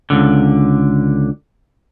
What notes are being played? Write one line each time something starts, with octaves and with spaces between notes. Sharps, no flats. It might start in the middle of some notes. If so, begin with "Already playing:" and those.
C#2 D3